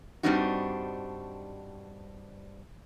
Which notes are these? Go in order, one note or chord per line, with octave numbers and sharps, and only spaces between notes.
G2 G3 C4 D4 D#4 F#4